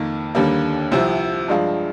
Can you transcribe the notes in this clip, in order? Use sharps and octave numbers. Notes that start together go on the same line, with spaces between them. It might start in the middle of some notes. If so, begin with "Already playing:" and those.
Already playing: F2 D#3 A#3
D#2 D3 G3 A#3
C2 C3 F3 C4
G2 F3 G#3 D4 F4